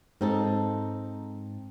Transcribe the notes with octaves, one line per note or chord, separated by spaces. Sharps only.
G#2 C4 D#4 A4